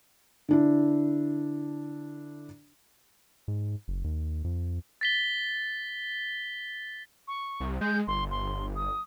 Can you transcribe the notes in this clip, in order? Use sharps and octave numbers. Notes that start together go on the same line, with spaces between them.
D3 D4 E4
G#2
F#1
D#2
F2
A6 B6 G7
C#6
C2
G#3 G6
G1 C6
C6
D#6